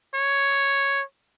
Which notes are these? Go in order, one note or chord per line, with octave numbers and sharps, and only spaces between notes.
C#5